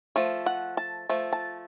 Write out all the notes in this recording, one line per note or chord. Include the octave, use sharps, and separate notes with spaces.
F3 A3
F#5
A5
F3 A3
A5